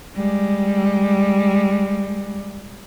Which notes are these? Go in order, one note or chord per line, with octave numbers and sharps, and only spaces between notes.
G3 G#3